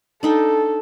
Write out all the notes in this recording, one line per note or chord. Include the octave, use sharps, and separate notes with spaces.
D4 D#4 A4 G5